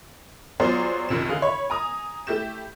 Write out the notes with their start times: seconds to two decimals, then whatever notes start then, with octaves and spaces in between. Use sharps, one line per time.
0.60 F#3 B3 F4 G#4 C5 D5
1.09 F#1 B1 F#2 C3 F3 E7
1.29 D3 G#4 F5
1.42 C#5 B5
1.70 G#5 A#5 D#6
2.27 A3 E4 G4 G6 E7